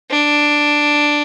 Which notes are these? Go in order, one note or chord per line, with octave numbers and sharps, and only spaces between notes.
D4